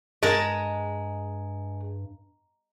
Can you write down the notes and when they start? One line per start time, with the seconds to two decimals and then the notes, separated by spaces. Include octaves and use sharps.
0.23 G2 G#3 A#4 A5